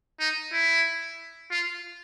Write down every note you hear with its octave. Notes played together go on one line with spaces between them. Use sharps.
D#4
E4
F4